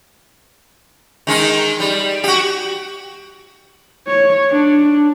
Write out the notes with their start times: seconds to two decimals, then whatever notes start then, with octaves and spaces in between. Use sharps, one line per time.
1.27 D#3 G#3 D#4
1.80 G3
2.24 F#4 G4
4.08 C#5
4.51 D4